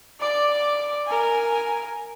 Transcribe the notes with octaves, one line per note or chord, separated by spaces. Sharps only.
D5 D6
A#4 G#5